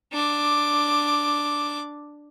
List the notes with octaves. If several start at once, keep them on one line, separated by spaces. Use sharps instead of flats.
D4 D6